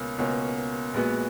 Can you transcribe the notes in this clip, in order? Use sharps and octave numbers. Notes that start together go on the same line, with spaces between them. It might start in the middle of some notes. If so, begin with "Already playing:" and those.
Already playing: C#2 B2 A#3 C#4
C#2 B2 A#3 C#4
A#1 A#2 G#3 B3 F#4